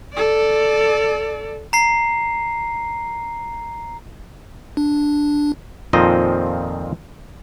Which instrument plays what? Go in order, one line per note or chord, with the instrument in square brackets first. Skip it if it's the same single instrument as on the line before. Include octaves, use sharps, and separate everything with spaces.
[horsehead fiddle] A4 D5
[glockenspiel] A#5 C7
[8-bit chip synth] D4
[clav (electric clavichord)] F2 A#2 D#3 F3 C4 D#5